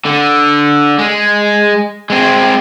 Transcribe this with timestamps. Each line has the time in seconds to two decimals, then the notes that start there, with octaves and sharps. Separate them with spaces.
0.05 D3
0.98 G#3
2.10 G#3 C4